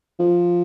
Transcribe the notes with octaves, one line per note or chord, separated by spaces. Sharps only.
F3